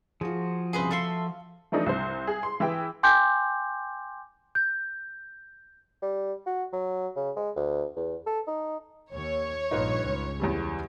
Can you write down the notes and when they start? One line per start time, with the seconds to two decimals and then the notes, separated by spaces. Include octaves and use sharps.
0.21 F3 F4 F#4 G#4
0.73 C2 C#3 G#4 B4 C5
0.91 A3 E5 F5 C6 C#7
1.72 E3 F3 A3 D4 D#4
1.86 C2 C5
2.27 G#4
2.43 C6
2.60 E3 E4 G#4 G5
3.03 G5 G#5 C6 D6 G6
4.55 G6
6.02 G3
6.46 F#4
6.73 F#3
7.16 C#3
7.36 G#3
7.56 D2
7.96 E2
8.26 A4
8.47 D#4
9.12 D#2 C#5
9.71 A#1 G2 D#4 F4 B4
10.05 C#2
10.40 E2 E3 G3